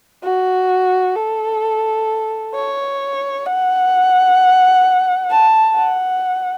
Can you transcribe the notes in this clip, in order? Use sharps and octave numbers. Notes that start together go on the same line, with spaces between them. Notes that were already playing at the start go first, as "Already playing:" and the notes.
F#4
A4
C#5
F#5
A5
F#5